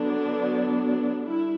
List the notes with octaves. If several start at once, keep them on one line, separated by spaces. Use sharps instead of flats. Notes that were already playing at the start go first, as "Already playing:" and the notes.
Already playing: D3 F#3 B3 D4
G3 D4 E4